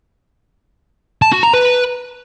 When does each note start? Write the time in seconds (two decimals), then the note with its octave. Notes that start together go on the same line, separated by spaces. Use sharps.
1.22 A5
1.32 F#4
1.43 A#5
1.53 B4